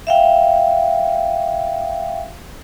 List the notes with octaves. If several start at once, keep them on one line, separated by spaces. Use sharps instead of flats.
E5 F5 G5